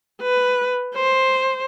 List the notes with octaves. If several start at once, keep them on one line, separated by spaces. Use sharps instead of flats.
B4
C5